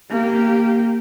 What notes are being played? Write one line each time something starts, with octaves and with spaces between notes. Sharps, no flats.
A#3 G4